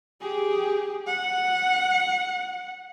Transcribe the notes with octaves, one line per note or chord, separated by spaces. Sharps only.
G4 G#4
F#5